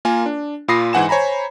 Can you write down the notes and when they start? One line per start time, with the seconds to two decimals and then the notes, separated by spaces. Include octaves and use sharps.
0.05 A#3 F4 A#4 G#5
0.26 D4
0.68 A#2 F4 B5 D#6 A#6 C7
0.93 G#2 E3 F#5 G#5 E7
1.09 C5 C#5 G#5 A#5 B5